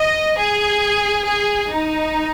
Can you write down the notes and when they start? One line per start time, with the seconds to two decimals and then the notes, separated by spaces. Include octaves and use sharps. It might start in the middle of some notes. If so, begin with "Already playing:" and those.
Already playing: D#5
0.37 G#4
1.26 G#4
1.69 D#4